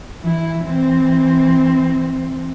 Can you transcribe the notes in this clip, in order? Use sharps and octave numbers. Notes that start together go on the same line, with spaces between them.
E3 E4
E3 C4